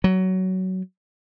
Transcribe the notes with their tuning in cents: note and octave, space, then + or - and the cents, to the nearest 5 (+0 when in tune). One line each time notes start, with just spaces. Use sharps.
F#3 +15